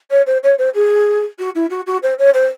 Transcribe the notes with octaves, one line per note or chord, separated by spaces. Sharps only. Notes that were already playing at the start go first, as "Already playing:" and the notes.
C#5
C5
C#5
C5
G#4
F#4
E4
F#4
F#4
C5
C#5
C5